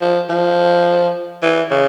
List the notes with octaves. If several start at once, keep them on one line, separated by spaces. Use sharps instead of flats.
F3
F3
E3
C#3